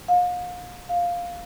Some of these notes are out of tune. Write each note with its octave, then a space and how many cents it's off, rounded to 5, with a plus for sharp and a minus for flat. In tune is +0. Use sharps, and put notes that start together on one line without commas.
F5 +40
F5 +5